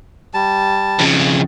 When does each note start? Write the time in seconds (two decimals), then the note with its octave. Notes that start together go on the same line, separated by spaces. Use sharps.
0.34 G3 A5
0.99 F2 C#3